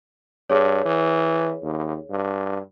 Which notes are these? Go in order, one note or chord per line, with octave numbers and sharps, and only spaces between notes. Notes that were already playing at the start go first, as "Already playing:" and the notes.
G2 G#4 C#5
E3
D#2
G2